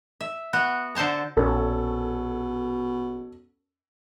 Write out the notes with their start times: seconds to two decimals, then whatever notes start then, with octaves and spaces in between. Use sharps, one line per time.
0.21 E5
0.53 B3 F#4
0.95 D3 A4 C5 A5 A#5
1.37 A#1 B2 C#4 A4